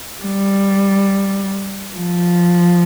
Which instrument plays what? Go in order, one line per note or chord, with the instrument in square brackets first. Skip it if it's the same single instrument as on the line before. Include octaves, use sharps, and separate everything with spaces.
[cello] G3
F3